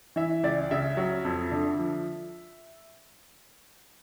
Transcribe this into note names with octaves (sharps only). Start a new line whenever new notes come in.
E3 E5
C#2 D5
C#3 E5
F#3
F2
D3
F3